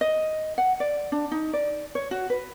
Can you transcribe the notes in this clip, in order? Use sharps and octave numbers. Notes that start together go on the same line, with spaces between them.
D#5
F#5
D5
D4
D#4
D5
C#5
F#4
B4